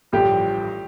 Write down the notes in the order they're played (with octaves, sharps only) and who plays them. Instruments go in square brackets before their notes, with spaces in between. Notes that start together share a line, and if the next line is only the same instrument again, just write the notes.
[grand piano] A1 G2 D3 F3 [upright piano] G4